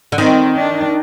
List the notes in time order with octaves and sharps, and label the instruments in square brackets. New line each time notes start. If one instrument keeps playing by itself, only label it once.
[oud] D3
[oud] D#3 [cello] C4
[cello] D4